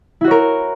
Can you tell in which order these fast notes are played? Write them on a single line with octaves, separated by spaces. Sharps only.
E4 F#4 C#5 A#4